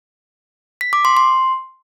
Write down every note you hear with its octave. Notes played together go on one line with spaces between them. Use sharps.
B6
D6
C6
C6